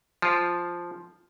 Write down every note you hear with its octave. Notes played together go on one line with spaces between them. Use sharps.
F3 F4